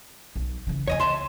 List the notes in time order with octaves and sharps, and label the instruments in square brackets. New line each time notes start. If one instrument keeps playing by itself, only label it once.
[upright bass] B1
C#3 E3
[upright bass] E2 C3 [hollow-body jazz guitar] C#5 D#5 G#5
[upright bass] C#2 [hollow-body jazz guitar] E5 A5 C6